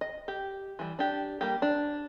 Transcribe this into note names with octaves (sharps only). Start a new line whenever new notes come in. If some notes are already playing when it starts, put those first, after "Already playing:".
D#5
G4
E3 G3
D4 G4
G3 A#3 G4
D4